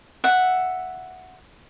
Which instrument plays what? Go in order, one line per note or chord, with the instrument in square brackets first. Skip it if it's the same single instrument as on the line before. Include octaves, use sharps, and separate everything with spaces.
[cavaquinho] E5 F#5